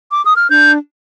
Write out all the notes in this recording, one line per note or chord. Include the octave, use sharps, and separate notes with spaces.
D6
D#6
F6
D4 G6